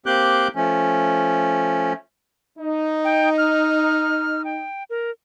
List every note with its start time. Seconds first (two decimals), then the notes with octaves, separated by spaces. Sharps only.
0.06 A#3 C4 G4 D6 F#6 G6
0.56 F3 A3 C#4
2.58 D#4
3.05 G5
3.38 F6
4.45 G5
4.90 A#4